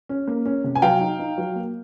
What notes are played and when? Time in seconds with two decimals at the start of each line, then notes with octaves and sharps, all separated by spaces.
0.09 C#4
0.27 A#3
0.46 C#4
0.64 C3
0.75 G#5
0.82 F#3 F5 G5
1.01 D#4
1.19 D#4
1.38 F#3
1.56 A#3